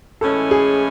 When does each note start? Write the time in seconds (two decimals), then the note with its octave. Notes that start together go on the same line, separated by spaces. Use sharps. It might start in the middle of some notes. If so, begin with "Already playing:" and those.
0.21 A2 E3 G#3 C#4 A4
0.51 G#4